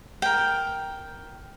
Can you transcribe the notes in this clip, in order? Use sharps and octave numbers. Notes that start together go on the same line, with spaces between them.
A#4 G5